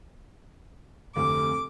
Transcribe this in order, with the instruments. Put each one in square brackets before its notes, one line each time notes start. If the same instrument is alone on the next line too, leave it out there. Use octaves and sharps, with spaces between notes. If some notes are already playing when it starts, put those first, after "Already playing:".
[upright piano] F1 D2 C3 [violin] D6